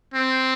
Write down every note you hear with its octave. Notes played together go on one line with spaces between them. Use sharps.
C4